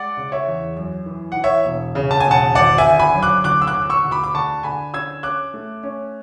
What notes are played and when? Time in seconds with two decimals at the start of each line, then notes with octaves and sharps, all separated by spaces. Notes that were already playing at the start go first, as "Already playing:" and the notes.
Already playing: G#3 D5 F#5
0.17 C#3
0.32 C#5 E5
0.48 E2
0.77 F#2
1.06 E3
1.32 E3 F#5
1.44 C#5 E5
1.65 E1
1.95 C#3
2.11 A5
2.20 E1 G#5
2.31 F#5 A5
2.55 G#1 D5 F#5
2.78 E5 G#5
2.86 D3
3.00 G#5 B5
3.14 F#2
3.23 D6 F#6
3.44 D2 D6 F#6
3.62 E6
3.67 D6 F#6
3.75 D2
3.90 C#6 E6
4.04 D2
4.11 B5 D6
4.24 D6
4.34 D3 A5 C#6
4.63 D3 G#5 B5
4.94 C#4 E6 G#6
5.23 C#4 D6 F#6
5.54 A3
5.83 C#4